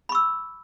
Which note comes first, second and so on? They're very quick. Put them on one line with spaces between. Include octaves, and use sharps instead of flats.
B5 C#6 E6